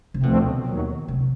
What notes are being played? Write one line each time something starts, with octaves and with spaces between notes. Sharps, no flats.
C3
D2 B2 D3 F3 A3 C4
D#2 D#3 F#3
C3